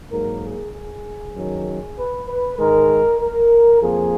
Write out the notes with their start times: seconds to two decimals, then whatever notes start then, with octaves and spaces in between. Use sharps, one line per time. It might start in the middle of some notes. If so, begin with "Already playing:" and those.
0.12 G#2 F#3 A#3 A#4
0.43 G#4
0.73 G#4
1.35 F#2 D#3 F#3
1.97 B4
2.27 B4
2.58 G#2 D#3 G#3 A#4
3.20 A#4
3.81 F2 F3 A#3 G#4